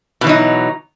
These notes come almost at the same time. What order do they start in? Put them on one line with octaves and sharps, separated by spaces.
B2 E3 F#3 D#4